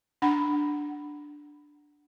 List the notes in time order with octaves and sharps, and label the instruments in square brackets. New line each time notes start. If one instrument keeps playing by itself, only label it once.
[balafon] D4 F#5 B5